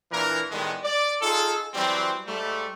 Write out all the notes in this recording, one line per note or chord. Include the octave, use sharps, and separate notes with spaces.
A#2 E3 D4 A#4
A2 D#3 G3 G#3 B3
D5
D#4 F4 G#4 A4
E3 F#3 G3 C4
G#2 G3 A3